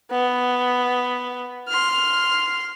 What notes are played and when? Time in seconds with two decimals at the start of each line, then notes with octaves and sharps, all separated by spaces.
0.11 B3
1.69 C6 F6